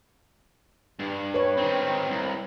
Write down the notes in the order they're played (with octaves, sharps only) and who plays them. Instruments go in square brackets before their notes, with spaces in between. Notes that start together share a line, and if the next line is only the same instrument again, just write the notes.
[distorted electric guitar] G2
[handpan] B4 C#5
[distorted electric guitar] D#3 C4
C2